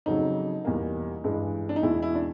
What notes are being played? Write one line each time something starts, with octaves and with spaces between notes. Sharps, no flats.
F2 C#3 F#3 D#4
E2 B2 G3 A#3
G2 E3 G#3
D4
D#4
E2 B2 G#3 E4
E4
D4